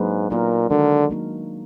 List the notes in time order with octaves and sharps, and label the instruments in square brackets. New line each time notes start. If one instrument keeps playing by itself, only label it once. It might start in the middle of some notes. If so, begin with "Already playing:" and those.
Already playing: [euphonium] G#2 [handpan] F#3 A#3 D4 G#4 B4
[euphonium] A#2 [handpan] F#3 B3 D#4 F#4 A#4
[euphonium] D3 [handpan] D#3 G#3 D4 F#4 A#4
[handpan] F#3 A#3 D#4